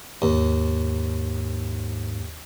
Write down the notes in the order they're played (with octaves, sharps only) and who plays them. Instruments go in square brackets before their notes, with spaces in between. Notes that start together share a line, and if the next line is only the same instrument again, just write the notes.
[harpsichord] D#2 [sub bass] G#2